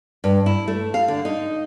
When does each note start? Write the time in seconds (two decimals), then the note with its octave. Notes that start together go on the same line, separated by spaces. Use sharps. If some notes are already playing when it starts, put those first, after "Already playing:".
0.24 G2
0.46 E4
0.68 A3
0.94 F5
1.08 D3
1.25 D#4